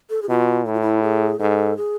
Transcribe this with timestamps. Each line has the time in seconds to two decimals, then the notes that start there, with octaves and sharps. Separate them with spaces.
0.10 A4
0.22 G#4
0.29 B2 F4
0.65 A2 E4
0.74 F4
0.81 E4
1.03 G#4
1.39 G#2 A4
1.77 G#4